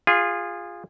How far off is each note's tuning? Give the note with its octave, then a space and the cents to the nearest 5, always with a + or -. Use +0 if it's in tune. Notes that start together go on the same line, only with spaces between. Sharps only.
F4 +0 G#4 -25